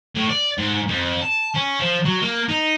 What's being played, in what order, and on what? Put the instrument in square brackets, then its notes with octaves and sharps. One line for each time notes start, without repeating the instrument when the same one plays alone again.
[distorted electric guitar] A2
D5
G#2
F2
A5
C#4
F3
F#3
A#3
D#4